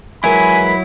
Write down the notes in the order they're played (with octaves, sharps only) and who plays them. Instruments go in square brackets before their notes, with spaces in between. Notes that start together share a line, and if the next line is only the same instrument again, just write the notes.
[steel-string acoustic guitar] E3 G#3 A#4 [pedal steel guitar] F#3 E4 [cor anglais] G#5 [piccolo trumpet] B5